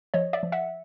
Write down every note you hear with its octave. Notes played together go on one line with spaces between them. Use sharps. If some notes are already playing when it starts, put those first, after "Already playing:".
F3 C#5 D#5
D5 E5
F3
E5 F#5